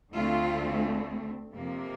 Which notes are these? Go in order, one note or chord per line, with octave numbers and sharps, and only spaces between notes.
D2 D3 A3 C4 F4
F2 C3 F3 A#3